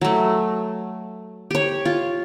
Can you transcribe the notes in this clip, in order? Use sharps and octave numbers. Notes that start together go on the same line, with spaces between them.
F#3 A3
G4 C#5
F4